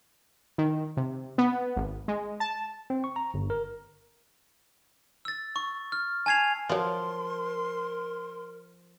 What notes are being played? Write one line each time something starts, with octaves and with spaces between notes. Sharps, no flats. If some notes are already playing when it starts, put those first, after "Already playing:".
D#3
C3
B3
G#1
G#3
A5
C4
C#6
A#5
G1
A#4
E6 A6
C#6
F6
G#5 A5 G#6 C7 F7
F3 F#3 F4 A#4 C6